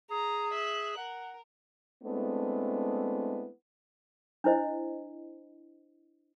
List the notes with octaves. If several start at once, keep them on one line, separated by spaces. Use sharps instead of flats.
G#4 A#5
E5 F#6
A#4 F#5
G#3 A3 B3 C4 D4 E4
D4 E4 C5 D#5